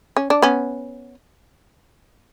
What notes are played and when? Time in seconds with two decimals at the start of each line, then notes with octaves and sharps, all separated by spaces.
0.16 C#4
0.30 D4
0.42 B3 C#4